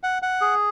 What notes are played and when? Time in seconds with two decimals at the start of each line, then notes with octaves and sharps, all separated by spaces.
0.03 F#5
0.22 F#5
0.41 G#4